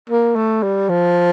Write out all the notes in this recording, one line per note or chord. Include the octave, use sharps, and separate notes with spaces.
A#3
A3
G3
F3